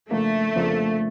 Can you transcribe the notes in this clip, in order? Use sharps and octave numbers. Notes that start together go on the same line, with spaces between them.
F2 C#3 F3 A3 A#3 D4
F2 C#3 F3 A#3 D4